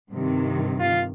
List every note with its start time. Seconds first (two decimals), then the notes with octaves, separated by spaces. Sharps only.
0.12 G2 C3 D#3
0.79 F4